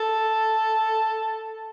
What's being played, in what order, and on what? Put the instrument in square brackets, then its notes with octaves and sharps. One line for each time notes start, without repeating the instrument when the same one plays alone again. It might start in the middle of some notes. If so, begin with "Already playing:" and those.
Already playing: [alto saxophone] A4